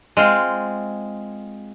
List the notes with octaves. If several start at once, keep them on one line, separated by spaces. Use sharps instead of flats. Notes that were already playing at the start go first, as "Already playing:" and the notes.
G#3 C4 F4